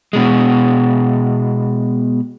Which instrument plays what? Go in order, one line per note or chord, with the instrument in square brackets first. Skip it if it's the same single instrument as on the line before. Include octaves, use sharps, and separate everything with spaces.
[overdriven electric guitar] B2 G#3